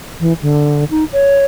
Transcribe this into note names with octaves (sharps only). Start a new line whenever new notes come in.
E3
D3
D#4
C#5